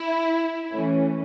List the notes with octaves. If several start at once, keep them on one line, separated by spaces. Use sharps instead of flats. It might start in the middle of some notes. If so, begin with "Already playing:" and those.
Already playing: E4
E3 A3 C#4